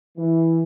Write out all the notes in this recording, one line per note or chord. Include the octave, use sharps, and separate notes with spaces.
E3